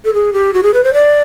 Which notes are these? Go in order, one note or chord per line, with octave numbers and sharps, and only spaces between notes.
A4
G#4
G4
F#4
G#4
B4
C5
D5